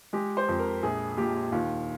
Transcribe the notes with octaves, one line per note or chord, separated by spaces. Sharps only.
G#3 G4
C5
F2
A#4
A#1 G#4
A#2 G4
D#2 F4